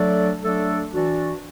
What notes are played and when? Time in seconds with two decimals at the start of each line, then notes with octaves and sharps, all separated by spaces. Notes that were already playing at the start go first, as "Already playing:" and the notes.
Already playing: F#3 A3 D4 A4 D5
0.41 F#3 A3 D4 A4 D5
0.92 E3 D4 F#4 D5